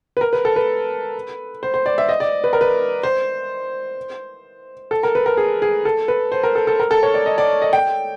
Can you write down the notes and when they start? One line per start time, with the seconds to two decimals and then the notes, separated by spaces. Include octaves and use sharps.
0.17 B4
0.21 A#4
0.33 B4
0.45 A4
0.56 B4
1.63 C5
1.74 C5
1.86 D5
1.98 E5
2.09 D#5
2.20 D5
2.44 B4
2.53 A#4
2.61 B4
3.03 C5
4.91 A4
5.03 A#4
5.15 B4
5.26 A#4
5.37 G#4
5.62 G#4
5.85 A4
6.08 B4
6.32 C5
6.43 A#4
6.55 A4
6.67 A4
6.80 A#4
6.91 A4
7.03 C#5
7.14 D5
7.26 D#5
7.38 D5
7.62 D#5
7.73 G5